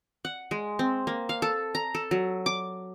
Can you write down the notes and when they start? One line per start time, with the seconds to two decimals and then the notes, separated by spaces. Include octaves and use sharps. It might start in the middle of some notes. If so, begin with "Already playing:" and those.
0.25 F#5
0.51 G#3
0.79 C4
1.07 A#3
1.29 F5
1.42 A4
1.75 A#5
1.95 A4
2.11 F#3
2.46 D6